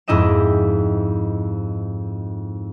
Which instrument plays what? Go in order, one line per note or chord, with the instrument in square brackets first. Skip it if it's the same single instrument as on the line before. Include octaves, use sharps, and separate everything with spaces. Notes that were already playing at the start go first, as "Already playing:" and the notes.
[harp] F2 G#2 E4 G4 D#5 E7